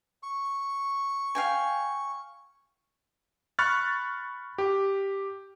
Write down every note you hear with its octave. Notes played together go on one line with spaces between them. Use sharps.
C#6
F5 G5 G#5
B5 C#6 F6 F#6 A6
G4